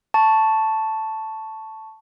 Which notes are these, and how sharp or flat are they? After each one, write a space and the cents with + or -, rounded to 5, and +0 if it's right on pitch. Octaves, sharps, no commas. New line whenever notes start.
A5 +0 C#6 +0